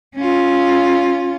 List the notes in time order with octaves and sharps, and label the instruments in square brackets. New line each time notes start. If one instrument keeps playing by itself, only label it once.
[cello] C#4 F4